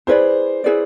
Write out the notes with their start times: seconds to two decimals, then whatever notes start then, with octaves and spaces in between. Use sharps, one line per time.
0.07 E4 G#4 B4 C5 D5
0.64 E4 G#4 B4 D5